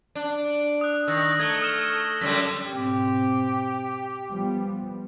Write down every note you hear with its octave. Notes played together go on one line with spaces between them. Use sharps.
D4
D#6 F#6
D#3 E6 A#6
A3 G#6 G7
D#6 F6 E7
F#2 D3 G3 B6
G#2 B2 C4 G4
F3 G3 B3